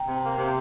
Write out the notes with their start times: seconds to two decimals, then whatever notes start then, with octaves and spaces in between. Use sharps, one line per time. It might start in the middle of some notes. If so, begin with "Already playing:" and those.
Already playing: G5 A#5
0.08 C3
0.23 A#3
0.38 C3